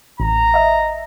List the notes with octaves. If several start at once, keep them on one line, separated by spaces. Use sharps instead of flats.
A1 A#5
D#5 E5